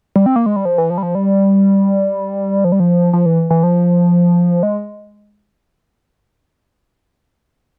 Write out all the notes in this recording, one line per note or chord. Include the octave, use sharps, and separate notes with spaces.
G3
C4
A#3
G#3
G3
F3
E3
F3
G3
F3
G3
F3
G3
F3
F3
E3
E3
F3
G#3